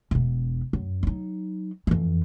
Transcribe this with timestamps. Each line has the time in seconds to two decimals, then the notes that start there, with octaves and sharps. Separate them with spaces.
0.11 E1 B3
0.73 F#2
1.03 F#3 D#4
1.87 F2 E3